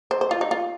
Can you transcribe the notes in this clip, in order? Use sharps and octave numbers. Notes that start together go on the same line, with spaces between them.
C5
C5
F4
D#4
F4